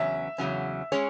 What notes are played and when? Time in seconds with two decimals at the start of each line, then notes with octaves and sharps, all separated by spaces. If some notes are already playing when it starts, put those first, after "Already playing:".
Already playing: E2 C#3 F#3 C#4 E5
0.38 E2 C#3 F#3 C#4
0.92 G#3 C#4 G#4 C#5